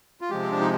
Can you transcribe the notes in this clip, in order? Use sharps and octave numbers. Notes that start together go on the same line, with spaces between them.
F4
C3 F3 G#3 G4
C4
D4
D#4